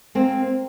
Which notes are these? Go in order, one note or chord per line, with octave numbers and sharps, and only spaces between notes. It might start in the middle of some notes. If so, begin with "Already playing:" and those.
A#3 C4